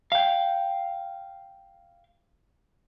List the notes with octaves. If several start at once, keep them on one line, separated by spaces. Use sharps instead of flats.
F5 G5